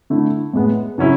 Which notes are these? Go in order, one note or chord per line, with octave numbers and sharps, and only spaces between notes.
D3 A3 E4
A2 G#3 B3
C#3 F#3 C#4 E4